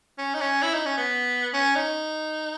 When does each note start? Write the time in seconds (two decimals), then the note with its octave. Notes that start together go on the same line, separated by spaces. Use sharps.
0.18 C#4
0.34 D#4
0.41 C#4
0.63 E4
0.74 D#4
0.86 C#4
0.97 B3
1.54 C#4
1.76 D#4